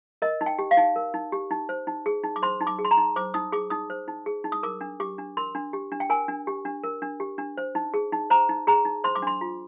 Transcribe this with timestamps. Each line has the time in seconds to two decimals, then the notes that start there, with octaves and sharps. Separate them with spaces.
0.22 A#4 D#5
0.41 D#4
0.46 G5
0.59 G4
0.71 F5
0.77 D#4
0.96 A#4
1.14 D#4
1.32 G4
1.51 D#4
1.69 C5
1.87 D#4
2.06 G#4
2.24 D#4
2.36 D6
2.43 C5 C6
2.61 D#4
2.67 D6
2.79 G#4
2.85 C6
2.91 A#5
2.97 D#4
3.16 C5 D6
3.34 D#4 D#6
3.52 G#4 D6
3.70 D#4 D#6
3.90 C5
4.08 D#4
4.26 G#4
4.44 D#4
4.52 D#6
4.63 A#4 D6
4.81 D4
5.00 G4 D6
5.18 D4
5.37 A#4 C6
5.55 D4
5.73 G4
5.92 D4
6.00 G5
6.10 A#4 G#5
6.28 D4
6.47 G4
6.65 D4
6.84 A#4
7.02 D4
7.20 G4
7.38 D4
7.58 C5
7.75 D#4
7.94 G#4
8.12 D#4
8.30 C5 A#5
8.49 D#4
8.67 G#4 A#5
8.85 D#4
9.04 C5 C6
9.15 D6
9.22 D4 C6
9.41 F4